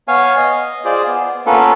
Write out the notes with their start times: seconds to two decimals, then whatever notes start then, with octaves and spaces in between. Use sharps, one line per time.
0.08 B3 C#5 F5 G#5
0.37 D#5
0.85 F4 G#4 C5 D5
1.07 B3
1.46 A#3 B3 C#4 F4 A4 B4